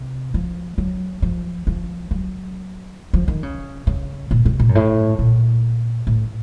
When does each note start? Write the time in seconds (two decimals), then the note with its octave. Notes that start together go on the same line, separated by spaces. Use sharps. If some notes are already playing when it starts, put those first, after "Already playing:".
Already playing: C3
0.34 F3
0.78 F#3
1.22 F3
1.67 F3
2.11 F#3
3.13 F3
3.28 D#3
3.43 C#3
3.87 C#3
4.31 A#2
4.45 C3
4.60 A#2
4.69 F#2
4.75 A2
5.19 A#2
6.07 A2